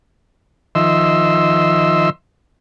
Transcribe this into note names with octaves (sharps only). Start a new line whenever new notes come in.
D#3 F3 D#5 E5 C6 E6